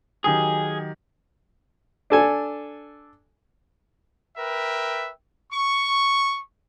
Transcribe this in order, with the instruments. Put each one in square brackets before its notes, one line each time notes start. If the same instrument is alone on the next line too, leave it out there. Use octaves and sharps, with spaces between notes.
[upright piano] D#3 F#3 G4 [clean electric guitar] G#4
[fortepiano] D4 A4 G#5
[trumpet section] A#4 B4 E5 G5
C#6